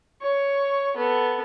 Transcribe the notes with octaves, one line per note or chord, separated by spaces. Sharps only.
C#5 C#6
B3 A4